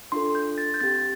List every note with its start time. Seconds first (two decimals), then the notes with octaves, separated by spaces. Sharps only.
0.12 D4 F4 A4 C6
0.35 G6
0.58 A6
0.74 G6
0.81 C4 G4 A6